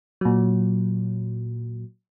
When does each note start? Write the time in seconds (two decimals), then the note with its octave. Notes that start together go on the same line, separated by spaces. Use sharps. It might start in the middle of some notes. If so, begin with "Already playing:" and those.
0.21 A#2 F#3